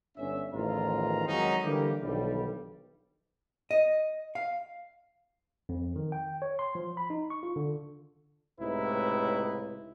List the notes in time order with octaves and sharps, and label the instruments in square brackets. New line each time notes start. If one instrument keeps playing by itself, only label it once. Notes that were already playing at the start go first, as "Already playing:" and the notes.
[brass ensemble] G1 C#4 E5
A1 E2 D#3 F3 F4 A#5
F2 D#3 F#3 G#3 C#4 D#4
D3 E3 G3 A#3 G4
B1 D3 D#3 F3 G3
[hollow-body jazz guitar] D#5
F5
[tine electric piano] F2
D#3
G5
C#5
C6
F3
B5
D#4
C#6
F4
D3
[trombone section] C#2 A2 C3 D#4 E4 B4